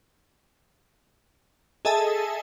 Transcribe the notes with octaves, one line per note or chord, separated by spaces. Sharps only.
G#4 A4 D#5 E5 G#5 A5